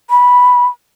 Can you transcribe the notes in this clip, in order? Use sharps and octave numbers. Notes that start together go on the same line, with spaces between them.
B5